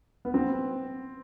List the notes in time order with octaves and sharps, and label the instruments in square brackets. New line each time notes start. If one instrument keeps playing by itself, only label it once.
[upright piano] B3
C4